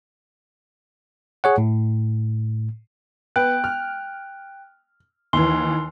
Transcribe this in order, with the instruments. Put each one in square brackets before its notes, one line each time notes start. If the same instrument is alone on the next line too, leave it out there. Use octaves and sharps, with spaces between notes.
[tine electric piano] G#4 C#5 F#5
A2
[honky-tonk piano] B3 [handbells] G5 F#6
[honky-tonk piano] F6
[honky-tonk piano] D#2 E3 [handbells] C6